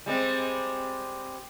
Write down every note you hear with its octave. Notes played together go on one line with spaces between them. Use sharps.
G3 G#3 C4